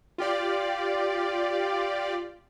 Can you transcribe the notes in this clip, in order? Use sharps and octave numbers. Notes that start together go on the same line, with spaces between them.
F4 G4 D5